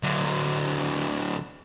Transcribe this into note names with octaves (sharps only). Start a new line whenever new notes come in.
D3 F#3